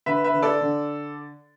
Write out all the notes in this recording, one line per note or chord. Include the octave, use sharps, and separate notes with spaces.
D3 B4 E5
B4 E5
D3
A4 D5
D3